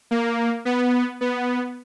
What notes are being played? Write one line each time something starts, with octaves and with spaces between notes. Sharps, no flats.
A#3
B3
B3